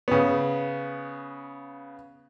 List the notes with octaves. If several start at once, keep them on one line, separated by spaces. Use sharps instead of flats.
C#3 B3